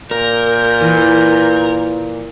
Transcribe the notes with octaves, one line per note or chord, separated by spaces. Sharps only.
A#2 A#4 G6
E3